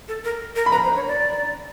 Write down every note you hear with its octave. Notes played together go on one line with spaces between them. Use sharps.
A4
A#4
A#4
B5
B4 A#5
C5
C#5
D5